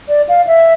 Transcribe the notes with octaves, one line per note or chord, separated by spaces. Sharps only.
D5
F5
E5